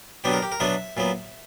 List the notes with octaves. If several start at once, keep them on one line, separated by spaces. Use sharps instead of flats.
B2 F#3 B3 D4 G4
A#4
G4
A#4
B2 F#3 B3 D4 E5
A#2 F#3 B3